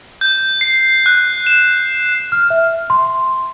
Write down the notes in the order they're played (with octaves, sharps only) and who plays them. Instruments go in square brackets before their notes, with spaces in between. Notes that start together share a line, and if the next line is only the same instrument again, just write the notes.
[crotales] G6
C7
F#6
E7
[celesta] F6
E5
C6